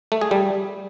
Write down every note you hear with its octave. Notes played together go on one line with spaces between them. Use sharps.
A3
G#4
G3